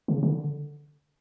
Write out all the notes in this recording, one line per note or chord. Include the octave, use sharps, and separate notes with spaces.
C#3
D3